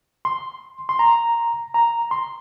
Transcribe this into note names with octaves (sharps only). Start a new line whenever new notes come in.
C6
C6
A#5
A#5
C6